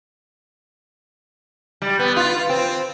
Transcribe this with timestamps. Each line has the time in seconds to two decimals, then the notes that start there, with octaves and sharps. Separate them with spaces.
1.82 G3
1.99 B3
2.16 F4
2.49 C4